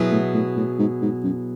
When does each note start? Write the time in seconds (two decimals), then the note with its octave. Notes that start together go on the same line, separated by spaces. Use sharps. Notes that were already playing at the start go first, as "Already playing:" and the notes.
Already playing: B2 F#3 B3 E4 G#4
0.12 A2
0.34 A2
0.57 A2
0.79 G#2
1.02 G#2
1.24 F#2